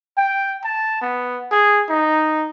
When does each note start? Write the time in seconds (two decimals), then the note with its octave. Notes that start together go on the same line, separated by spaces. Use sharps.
0.17 G5
0.64 A5
1.01 B3
1.51 G#4
1.89 D#4